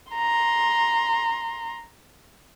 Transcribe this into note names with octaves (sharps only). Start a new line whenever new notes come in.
A#5 C6